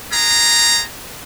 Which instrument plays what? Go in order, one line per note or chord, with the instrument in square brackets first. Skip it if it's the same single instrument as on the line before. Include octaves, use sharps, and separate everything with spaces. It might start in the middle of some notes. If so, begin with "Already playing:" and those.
[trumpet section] D4 F4 G#4 A#5